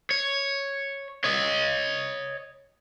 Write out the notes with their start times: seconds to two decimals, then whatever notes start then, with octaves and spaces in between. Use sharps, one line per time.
0.11 C#5
1.24 C#5 D#5